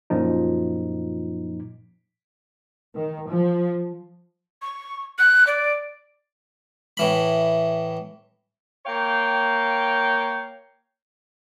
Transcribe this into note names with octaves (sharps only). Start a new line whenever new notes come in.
F#2 A#2 F3 D#4
D#3
F3
C#6
F#6
D5
A2 E3 B5
A#3 C#5 F5 G5